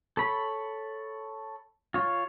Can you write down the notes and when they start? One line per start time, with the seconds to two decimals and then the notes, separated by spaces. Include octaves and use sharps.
0.17 A4 C#5 B5
1.94 F4 C#5